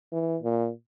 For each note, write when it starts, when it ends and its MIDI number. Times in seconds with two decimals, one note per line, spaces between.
0.13 0.37 52
0.43 0.70 46